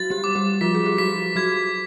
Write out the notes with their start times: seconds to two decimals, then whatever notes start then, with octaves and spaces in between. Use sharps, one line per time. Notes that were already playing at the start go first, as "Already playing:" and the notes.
Already playing: F#3 F#4 A6
0.10 G3 G4
0.24 D6
0.35 G3 G4
0.61 F3 F4 B6
0.74 G#4
0.86 G4
0.98 F#3 F#4 B6
1.36 F#3 F#4 G#6